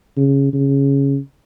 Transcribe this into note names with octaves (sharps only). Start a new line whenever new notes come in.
C#3
C#3